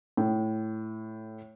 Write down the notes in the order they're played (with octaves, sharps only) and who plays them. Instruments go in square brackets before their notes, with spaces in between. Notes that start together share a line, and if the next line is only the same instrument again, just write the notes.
[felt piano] A2